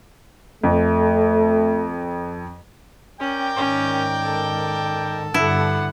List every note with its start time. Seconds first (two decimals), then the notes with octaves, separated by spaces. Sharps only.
0.63 F2 A3
3.20 C#4 A#4 D5 G5
3.56 G#2 D#3 C#4
4.22 A4
5.34 G2 D3 B3 D4 E4 F#5